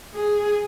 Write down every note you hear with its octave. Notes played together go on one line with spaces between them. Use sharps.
G#4